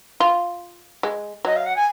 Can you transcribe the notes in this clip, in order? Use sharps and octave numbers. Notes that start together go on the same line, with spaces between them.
F4
G#3
F#3 D#5
F5
F#5
G#5